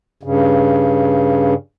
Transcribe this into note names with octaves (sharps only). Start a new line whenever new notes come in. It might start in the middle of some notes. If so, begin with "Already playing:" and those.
G2 C#3